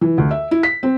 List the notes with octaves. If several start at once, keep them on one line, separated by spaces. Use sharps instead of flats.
E3
D2
E5
E4
B6
C4